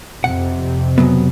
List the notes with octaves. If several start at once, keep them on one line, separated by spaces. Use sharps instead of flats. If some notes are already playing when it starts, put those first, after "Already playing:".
F2 C3 F#5
C#3 F#3 B3